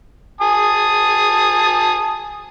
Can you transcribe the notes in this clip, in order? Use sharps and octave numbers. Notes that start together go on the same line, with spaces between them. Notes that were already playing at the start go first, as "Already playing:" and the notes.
G#5 A5 D#6